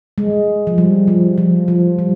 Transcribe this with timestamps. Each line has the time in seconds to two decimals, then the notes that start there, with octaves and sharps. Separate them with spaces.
0.18 G#3
0.67 F3
0.78 G3
1.08 F3
1.38 F3
1.68 F3
1.99 G3